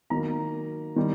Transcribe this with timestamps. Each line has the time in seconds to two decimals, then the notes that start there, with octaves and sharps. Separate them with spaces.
0.10 D#3 F#3 A#3 A#5
0.96 D#3 G3